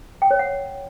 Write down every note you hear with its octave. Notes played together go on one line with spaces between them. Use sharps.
G5
C#5
F#5